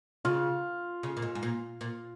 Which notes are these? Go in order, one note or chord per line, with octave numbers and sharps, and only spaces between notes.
C#3 F4
C#3
A#2
G#2
G#2
A#2
A#2